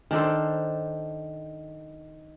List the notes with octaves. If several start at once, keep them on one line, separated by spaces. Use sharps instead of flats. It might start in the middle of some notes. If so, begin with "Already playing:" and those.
D#3 D4 A4 C5